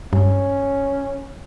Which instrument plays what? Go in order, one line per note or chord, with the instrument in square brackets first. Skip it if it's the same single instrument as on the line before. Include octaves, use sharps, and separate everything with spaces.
[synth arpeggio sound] G2 [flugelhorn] C#4